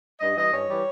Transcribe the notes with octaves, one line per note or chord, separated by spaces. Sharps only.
G2 D#5
E3 G3 D#5
G2 C#5
E3 G3